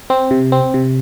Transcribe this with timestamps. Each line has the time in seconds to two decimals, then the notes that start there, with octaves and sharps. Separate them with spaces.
0.10 C4
0.31 C3
0.52 C4
0.74 C3